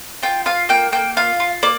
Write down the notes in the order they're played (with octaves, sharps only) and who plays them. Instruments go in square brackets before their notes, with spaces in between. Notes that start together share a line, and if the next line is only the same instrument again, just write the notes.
[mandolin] F4 G5
F4 F5
A#3 G5
A#3 G5
F4 F5
F4
A#3 D5